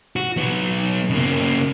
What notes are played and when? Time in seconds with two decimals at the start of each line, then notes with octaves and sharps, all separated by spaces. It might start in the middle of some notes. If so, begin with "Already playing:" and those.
0.16 F#4
0.37 F#3 B3
1.10 C#3 A#3